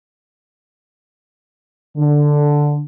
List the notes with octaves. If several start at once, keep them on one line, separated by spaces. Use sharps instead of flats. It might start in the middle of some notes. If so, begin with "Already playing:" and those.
D3